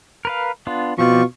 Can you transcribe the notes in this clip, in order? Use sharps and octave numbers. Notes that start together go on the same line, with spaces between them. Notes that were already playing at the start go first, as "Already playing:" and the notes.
A#4 B4 F5
B3 D4 F4
B2 F3 C4 F4 D5 C#6